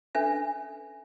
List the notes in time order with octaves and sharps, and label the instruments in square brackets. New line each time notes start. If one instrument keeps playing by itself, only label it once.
[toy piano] C#4 D4 A4 B4 E5 G#5